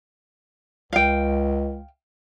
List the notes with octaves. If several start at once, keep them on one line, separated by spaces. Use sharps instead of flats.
C#2 F5 G5